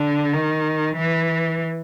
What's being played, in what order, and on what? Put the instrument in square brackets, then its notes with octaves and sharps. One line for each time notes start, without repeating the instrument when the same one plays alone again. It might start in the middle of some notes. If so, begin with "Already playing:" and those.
Already playing: [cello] D3
D#3
E3